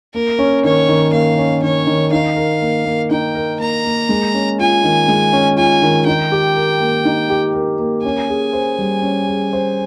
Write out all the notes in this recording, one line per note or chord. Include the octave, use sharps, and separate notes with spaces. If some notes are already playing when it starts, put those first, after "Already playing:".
A#3 A#4
C#4
D#3 C#5
D#3
A#3 F5
C#4
D#3 C#5
D#3
D#4 F5
A#4
A#3
A#3
D#4 G5
A#4
A#3 A#5
A#3
G#3
C#4
F4 G#5
D#3
G#3
C#4
F4 G#5
D#3
D#4 G5
G4
A#4
A#3
D#4
G4
A#4
A#3
C#4 G#5
G#4
C5
G3
C#4
G#4
C5